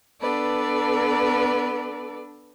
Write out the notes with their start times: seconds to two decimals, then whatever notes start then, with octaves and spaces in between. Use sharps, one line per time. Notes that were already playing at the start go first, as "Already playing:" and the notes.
0.21 B3 D4 A4 B4 D5